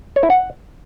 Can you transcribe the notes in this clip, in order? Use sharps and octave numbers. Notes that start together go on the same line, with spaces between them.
C#5
E4
F#5